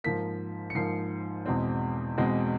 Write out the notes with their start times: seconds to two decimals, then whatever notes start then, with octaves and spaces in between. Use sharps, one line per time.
0.04 G#2 F3 A#3 B6
0.70 C#7
0.75 G#2 F3 A#3 C7
1.46 E2 B2 G#3 C4
2.17 E2 B2 G#3 C4